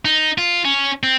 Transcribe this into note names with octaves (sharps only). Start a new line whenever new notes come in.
D#4
F4
C#4
C4